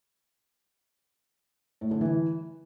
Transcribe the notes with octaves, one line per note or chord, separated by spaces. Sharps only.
A2
D3
E3